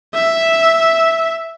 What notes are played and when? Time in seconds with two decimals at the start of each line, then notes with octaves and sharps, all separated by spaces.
0.14 E5